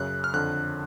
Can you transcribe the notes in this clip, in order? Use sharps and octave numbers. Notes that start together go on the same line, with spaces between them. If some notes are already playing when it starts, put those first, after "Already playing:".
Already playing: F#2 C#3 F#6
F6
F2 D3 F#6